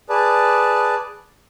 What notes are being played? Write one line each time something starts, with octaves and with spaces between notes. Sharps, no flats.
G#4 B4 D5 A5